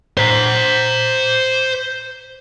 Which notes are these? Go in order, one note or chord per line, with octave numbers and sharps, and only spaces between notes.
C5 A#5